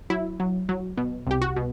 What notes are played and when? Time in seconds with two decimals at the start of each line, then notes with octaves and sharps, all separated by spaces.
0.10 F#3 E4
0.40 F#3
0.69 F#3
0.97 B2
1.27 C2 G4
1.42 F#4
1.56 B2